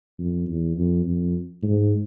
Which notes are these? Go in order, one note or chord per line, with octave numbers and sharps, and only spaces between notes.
F2
E2
F2
F2
G#2